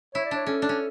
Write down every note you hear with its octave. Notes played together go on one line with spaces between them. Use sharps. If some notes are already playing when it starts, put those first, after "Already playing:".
E4 C#5
D5
D4 C#5
C#4 A4
D4
C#4